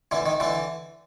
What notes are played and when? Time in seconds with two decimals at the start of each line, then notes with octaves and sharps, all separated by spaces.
0.11 D3 E3
0.26 D#3
0.40 D3 E3